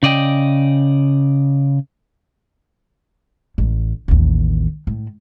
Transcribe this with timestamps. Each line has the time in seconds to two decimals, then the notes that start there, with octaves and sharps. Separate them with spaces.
0.03 C#3 D5 D#5 G5
3.58 A1
4.08 A1 D#2
4.87 A2